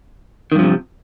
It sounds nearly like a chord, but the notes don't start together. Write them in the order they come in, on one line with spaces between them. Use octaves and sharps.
D#3 G2 F3 C3